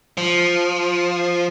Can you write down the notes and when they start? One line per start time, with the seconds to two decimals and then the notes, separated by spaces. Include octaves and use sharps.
0.18 F3